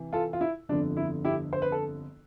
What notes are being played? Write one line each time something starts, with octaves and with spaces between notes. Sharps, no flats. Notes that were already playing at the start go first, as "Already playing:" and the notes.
Already playing: C3 E3
F4 A4
F4
E4
G1 F2 D3 F3 D4
E4
E4 G4
C5
B4
A4